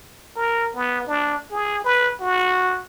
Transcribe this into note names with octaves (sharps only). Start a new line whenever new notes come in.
A#4
B3
D4
G#4
B4
F#4